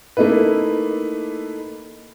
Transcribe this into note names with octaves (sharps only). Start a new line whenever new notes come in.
A3 A#3 D#4 E4 B4